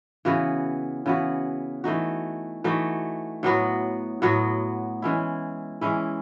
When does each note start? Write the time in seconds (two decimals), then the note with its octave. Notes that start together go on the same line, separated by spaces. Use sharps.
0.25 C#3 E3 B3 F#4
1.06 C#3 E3 B3 F#4
1.84 E3 A3 D#4 F#4
2.64 E3 A3 D#4 F#4
3.43 A2 F#3 B3 F#4
4.22 A2 F#3 B3 F#4
5.02 E3 G#3 C#4 E4
5.81 E3 G#3 C#4 E4